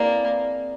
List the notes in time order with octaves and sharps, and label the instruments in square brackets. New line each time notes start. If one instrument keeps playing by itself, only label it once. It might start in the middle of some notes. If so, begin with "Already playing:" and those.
Already playing: [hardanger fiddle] A#3 [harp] C4 E4 G#4 B4 D5